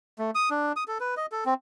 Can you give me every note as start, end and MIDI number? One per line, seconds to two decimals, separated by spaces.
0.19 0.31 57
0.35 0.49 87
0.51 0.72 62
0.76 0.84 87
0.88 0.98 69
1.00 1.15 71
1.17 1.26 75
1.32 1.44 69
1.46 1.54 60